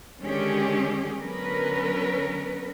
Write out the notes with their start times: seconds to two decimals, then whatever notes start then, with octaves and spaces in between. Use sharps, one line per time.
0.20 D3 D#3 G#3 C#4 G4 G#4
1.21 D3 F#3 B3 C#4 A#4 B4